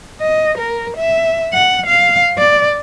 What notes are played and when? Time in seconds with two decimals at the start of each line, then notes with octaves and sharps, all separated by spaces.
0.21 D#5
0.58 A#4
0.97 E5
1.53 F#5
1.87 F5
2.38 D5